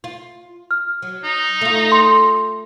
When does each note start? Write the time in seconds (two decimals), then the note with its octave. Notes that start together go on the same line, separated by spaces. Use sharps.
0.04 F4
0.71 F6
1.02 F#3
1.24 D#4
1.61 A3 F4
1.92 C6